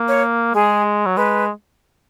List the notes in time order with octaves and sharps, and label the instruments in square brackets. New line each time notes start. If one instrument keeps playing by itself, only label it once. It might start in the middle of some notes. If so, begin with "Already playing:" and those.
Already playing: [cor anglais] A#3
[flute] C#5
[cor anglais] G#3 [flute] G#4
[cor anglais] F#3
[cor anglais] G#3 [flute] B4